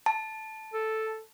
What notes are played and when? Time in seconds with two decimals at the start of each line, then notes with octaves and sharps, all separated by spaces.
0.06 A5
0.73 A4